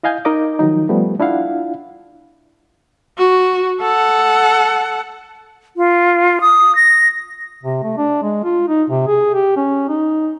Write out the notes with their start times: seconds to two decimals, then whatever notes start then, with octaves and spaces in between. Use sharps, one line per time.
0.03 E4 D#5 F5 G#5 G6
0.25 D#4 A#4 D#5 D6
0.59 D#3 F3 F#3 D#4
0.89 F3 G3 A3 B3
1.20 D4 E4 F4 F5 F#5
3.18 F#4
3.81 A4 F#5
5.77 F4
6.41 D#6
6.75 A#6
7.63 C3
7.83 A3
7.97 D4
8.22 G#3
8.44 F4
8.68 D#4
8.90 C3
9.07 G#4
9.34 G4
9.56 C#4
9.88 D#4